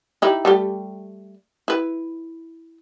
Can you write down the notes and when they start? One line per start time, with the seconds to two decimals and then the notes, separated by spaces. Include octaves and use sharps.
0.22 D#4 E4 G4
0.45 G3 A3 G4
1.68 E4 B4